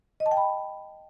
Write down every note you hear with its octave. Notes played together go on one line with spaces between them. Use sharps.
D#5
A5
G5
B5